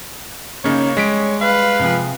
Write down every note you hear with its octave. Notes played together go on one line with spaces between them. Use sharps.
C#3 A#3 C#4 D#4 C#5
G3 G#3 B6 D7
B4 F5
C3 F3 G#4